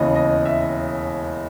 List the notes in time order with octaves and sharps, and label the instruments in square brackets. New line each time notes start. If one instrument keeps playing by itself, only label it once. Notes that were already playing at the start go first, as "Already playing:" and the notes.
Already playing: [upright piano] E1 D#2 C#3 E3 D#5
D#5
E5